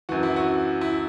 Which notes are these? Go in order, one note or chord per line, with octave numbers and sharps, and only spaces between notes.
F#2 E3 F#4
E4
F#4
E4